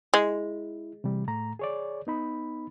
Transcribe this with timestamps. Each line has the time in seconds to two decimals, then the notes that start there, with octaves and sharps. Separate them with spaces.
0.14 G#3 E4
1.04 C3 E3 G3
1.27 A2 A3 A#5
1.59 G#4 C#5 D5
2.07 B3 D#4 B5